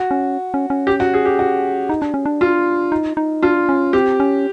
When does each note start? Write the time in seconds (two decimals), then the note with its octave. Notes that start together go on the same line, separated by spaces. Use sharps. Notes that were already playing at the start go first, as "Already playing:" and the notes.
Already playing: F#4
0.11 C#4
0.54 C#4
0.70 C#4
0.87 G4
1.00 F#4
1.14 G#4
1.25 G4
1.39 F#4
1.89 D#4
2.02 D4
2.14 C#4
2.26 D4
2.41 F4
2.92 D#4
3.17 D#4
3.43 D4 F4
3.69 C#4
3.93 C4 G4
4.20 C#4